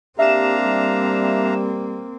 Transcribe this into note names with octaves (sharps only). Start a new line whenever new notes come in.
A#3 C4 D4 G4 E5 F5 A#5 E7
G3